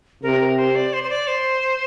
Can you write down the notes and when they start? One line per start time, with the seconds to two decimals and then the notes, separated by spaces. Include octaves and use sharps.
0.23 C3 A#4
0.41 A#4
0.57 C5
0.75 D5
0.93 C5
1.03 C5
1.10 D5
1.27 C5